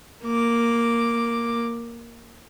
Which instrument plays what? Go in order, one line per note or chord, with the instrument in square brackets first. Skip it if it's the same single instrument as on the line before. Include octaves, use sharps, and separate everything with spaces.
[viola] A#3 D6